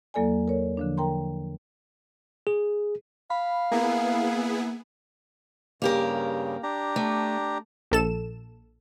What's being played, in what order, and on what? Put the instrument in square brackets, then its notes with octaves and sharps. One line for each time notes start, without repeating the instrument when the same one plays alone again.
[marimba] E2 F#3 A#3 A4 D5 G#5
A#4 C#5
D3 F3 D4
A#4 G5 A#5 C6
[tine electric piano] G#4
[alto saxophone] F5 [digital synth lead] B5
[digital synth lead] A#3 [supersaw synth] B3 E4 G#4
[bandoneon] G2 C#3 [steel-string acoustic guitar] A#3 G4 A#4
[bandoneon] D4 G4 A#5
[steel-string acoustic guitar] A3
[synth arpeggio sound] A#1 A4 E7